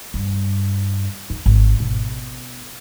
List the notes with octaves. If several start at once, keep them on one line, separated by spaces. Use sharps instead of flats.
G2
D#4
G#1
B2